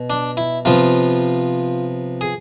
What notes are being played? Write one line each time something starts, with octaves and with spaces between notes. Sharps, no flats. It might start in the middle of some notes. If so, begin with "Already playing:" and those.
Already playing: B2
D4
E4
C3 F3 B3 F4
G#4